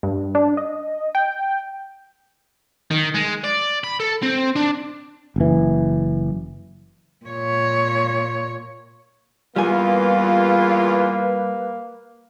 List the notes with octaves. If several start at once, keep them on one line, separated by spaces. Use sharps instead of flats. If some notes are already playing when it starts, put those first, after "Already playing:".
G2
D4
D#5
G5
D#3
G#3
D5
B5
A4
C4
D4
F#1 E3
A#2 C#5
E2 G3 A#3 F4 B4 G#5